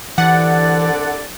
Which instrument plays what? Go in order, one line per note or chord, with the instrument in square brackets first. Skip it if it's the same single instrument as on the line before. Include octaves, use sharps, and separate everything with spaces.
[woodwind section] C2 D3 D5 [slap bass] E3 [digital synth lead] F#5